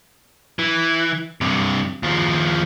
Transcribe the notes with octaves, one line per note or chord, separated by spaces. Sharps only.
E3
G2 C3
D#2 F3